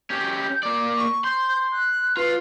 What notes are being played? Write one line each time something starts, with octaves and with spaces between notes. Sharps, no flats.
C#4 G4 G6
A#3 D5
C#6
C6 G6
F#6
F4 B4